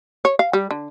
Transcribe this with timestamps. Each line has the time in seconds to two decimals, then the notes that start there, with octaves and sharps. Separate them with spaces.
0.25 C#5
0.39 F5
0.53 G3
0.71 D3